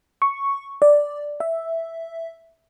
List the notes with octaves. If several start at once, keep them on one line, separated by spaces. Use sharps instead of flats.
C#6
D5
E5